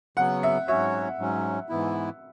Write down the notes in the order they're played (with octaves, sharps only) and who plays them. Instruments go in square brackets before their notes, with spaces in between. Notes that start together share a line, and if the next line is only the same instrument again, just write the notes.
[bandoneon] C#3 F#3 B3 [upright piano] F#5
[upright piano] E5
[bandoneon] G#2 F#3 C#4 F#4 C#5 [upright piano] E5
[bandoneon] G#2 F#3 C#4
G#2 E3 B3 E4